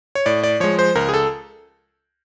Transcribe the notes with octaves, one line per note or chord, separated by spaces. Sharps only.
C#5
A2 D5
D5
F3 G#3 C#5
C5
C#2 A#4
G#4
A4